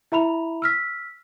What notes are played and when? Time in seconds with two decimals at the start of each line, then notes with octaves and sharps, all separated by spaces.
0.12 E4 E5 A#5 B5 F7
0.62 E6 F6 B6